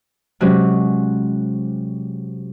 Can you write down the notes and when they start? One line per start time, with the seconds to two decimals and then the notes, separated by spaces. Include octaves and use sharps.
0.40 C3 F#3 G#3 C4 C#4 G4